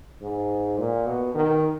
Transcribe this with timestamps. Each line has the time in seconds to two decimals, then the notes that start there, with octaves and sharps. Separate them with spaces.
0.22 G#2
0.78 A#2
1.06 B2
1.35 D#3